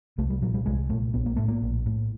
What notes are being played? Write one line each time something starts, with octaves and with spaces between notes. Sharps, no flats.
C2 A3
G3
A#2 F#3
G3
C2 G#3
A#2 A3
A#1 B3
A#3
A2 A3
A#3
A#1
A2